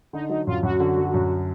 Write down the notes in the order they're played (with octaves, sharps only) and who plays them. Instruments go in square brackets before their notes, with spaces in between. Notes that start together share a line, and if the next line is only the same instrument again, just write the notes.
[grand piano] D3 [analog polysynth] D#4
[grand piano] F#3 [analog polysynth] D#4
[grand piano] F#2 [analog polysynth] F4
[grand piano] F#2 [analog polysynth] F#4
[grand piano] D3
F#3
F#2